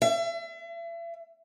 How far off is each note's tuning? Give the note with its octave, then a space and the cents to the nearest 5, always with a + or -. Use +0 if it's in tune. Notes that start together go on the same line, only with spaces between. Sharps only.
E5 +40